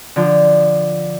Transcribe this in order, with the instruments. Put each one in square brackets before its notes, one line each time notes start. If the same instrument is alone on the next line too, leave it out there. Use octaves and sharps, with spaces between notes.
[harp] D3 F3